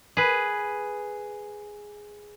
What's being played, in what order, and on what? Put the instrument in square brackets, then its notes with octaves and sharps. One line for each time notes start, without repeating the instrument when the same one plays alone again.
[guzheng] G#4 B4